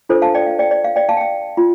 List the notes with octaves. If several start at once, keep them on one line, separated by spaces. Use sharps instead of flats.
D4 F4 A4 C5
F5 A5
D5 G5
F5
D5 G5
D5
F5
D5 G5
F5 A5
G5
F5
F4